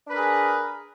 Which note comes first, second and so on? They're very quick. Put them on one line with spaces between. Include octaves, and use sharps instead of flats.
D4 B4 A#4 G#4